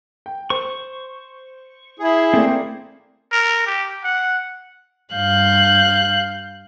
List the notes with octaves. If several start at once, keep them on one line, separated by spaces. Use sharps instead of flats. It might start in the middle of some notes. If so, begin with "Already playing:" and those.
G5
C5 C#6
E4 G#4
A3 A#3 C4 D5
A#4
G4
F#5
G2 F5 F#6 G6